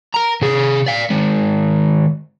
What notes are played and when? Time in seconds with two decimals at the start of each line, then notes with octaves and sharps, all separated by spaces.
0.14 A#4 A#5
0.42 C3 G#4
0.86 D5 F5
1.10 D#3 G#3